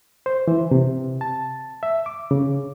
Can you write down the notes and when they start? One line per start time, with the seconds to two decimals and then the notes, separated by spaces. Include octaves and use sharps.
0.26 C5
0.48 E3
0.71 C3
1.21 A5
1.83 E5
2.06 D6
2.31 C#3